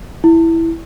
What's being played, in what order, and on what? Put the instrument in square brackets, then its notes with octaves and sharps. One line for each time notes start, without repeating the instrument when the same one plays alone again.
[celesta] E4